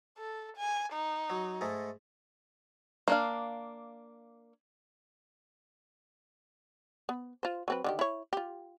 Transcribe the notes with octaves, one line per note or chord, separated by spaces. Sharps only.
A4
G#5
D#4
F#3
G#2 G#3 A3
A#3 D4 F5
B3
F4 C5
F#3 C4 B4
D3 D#3 G4
E4 C#5
F4 G4